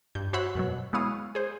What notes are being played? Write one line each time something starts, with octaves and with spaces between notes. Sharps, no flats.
G2 G6
F#4 C5 C#5 E5 F#5 B5
F#2 B2 F#3
G#3 B3 E4 C#5 F5 D#6
G#4 C5